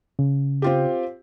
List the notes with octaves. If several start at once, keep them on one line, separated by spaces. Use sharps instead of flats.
C#3
C4 F4 G4